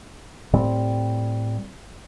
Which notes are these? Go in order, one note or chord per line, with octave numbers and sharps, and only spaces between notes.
A2 G3 C4